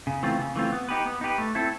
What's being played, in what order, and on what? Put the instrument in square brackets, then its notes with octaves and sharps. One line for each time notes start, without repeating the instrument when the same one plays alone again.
[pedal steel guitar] C#3
E3 A3 C4 F4
C#3
E3 A3 C4 F4
B3
D#4 G4 B4
B3
D#4 G4 B4
A3
C4 E4 A4